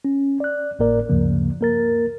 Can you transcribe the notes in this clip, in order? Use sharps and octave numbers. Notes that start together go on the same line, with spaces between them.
C#4
D5 F#6
G#1 A2 A#3 A#4 D5
D2 G2 C#3 F3 A#3
A#3 A#4 A6